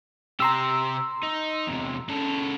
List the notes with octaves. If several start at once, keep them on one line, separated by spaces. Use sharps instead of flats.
C3 G4 A#5 C6 E6
D#4
E2 C3
C#3 A4